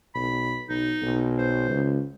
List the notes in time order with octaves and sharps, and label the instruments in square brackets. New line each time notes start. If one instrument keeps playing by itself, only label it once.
[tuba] B1 [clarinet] B5
[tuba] B1 [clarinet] D#4
[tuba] B1
[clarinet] C5
[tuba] C#2